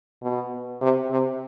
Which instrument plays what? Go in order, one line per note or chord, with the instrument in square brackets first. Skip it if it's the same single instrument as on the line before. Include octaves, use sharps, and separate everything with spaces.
[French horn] B2
C3
C3